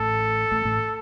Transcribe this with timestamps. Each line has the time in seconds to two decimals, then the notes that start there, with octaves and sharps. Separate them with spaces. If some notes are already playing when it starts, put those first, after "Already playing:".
Already playing: A1 A2 A4
0.51 A1 A2
0.65 A1 A2